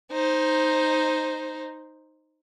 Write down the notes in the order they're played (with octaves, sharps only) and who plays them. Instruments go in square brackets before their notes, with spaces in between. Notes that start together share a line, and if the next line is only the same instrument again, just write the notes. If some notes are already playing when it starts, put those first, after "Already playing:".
[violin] D#4 C5